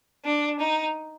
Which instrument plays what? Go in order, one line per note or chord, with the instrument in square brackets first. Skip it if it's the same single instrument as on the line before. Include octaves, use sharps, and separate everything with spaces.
[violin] D4
D#4